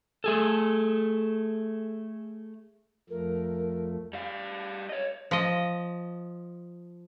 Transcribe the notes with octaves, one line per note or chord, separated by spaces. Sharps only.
A3 G#4 A4
F2 F3 A3 A#4
G3 F5
C#5 D#5
F3 D#5